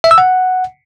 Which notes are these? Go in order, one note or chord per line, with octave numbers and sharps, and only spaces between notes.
E5
E6
F#5